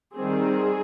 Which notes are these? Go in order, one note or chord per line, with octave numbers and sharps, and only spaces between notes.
D#3 G3 C4 G#4